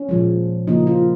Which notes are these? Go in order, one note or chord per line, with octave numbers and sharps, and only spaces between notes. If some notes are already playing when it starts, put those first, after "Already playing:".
Already playing: C#4
A#2 F3 G#3
C#3 F3 A#3 D#4
F4